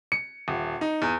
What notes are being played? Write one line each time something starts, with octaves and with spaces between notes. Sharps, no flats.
C#7
D#1
D#4
E2